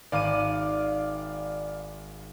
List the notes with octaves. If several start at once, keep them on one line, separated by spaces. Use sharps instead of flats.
G#1 D5 F5 D6 D#7